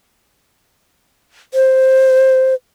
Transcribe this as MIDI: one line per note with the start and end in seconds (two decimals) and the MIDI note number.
1.54 2.54 72